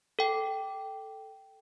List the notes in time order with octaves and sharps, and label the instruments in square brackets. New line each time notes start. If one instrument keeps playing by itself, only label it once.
[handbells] A4 G5